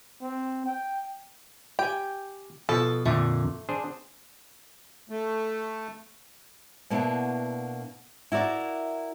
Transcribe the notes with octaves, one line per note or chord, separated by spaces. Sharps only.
C4
G5
G4 G5 G#5
B2 F3 A4
F2 A#2 D3 A3
D4 G#4 C5
A3
B2 A#3 B3 D4 E4
E4 F#4 A#4 D5